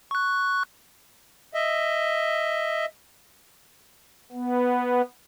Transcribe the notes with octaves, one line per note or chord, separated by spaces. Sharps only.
C#6 F#6
D#5 E5
B3